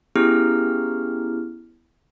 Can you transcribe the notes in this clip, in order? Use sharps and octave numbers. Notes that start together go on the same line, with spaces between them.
B3 C#4 E4 G4 G#4 F6